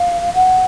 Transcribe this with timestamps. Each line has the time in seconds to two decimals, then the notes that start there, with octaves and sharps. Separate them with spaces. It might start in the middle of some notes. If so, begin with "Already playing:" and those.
Already playing: F5
0.34 F#5